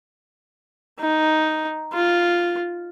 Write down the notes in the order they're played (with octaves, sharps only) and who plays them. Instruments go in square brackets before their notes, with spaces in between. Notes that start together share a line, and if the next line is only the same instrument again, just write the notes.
[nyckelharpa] D#4
F4